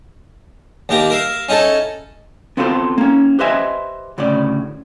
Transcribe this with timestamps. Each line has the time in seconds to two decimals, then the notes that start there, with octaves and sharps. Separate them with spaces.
0.89 D#2 A#3 G4 A#5
1.10 A#4 E5 F5
1.49 C#4 D#4 E4 A4
2.57 B3 C4 F4 F#4 A4 C5
2.98 A#3 C#4
3.39 G4 B4 C5 D#5 E5 G#5
4.18 D2 A2 C#3 D5